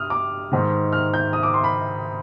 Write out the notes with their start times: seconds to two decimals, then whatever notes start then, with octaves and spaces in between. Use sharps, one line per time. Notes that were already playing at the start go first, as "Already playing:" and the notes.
Already playing: G2 D#6 F6
0.10 D6
0.52 G#2 D#3
0.93 F6
1.14 G6
1.33 D#6
1.43 D6
1.54 C6
1.64 B5